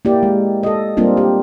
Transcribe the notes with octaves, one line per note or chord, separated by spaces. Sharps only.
A#3 E4 G4 D5
G#3
A4 D#5
G3 A#3 C4 D4 F4
G4